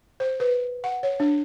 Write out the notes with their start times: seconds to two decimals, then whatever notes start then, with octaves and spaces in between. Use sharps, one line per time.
0.20 C5
0.40 B4
0.84 F#5
1.03 C#5
1.20 D4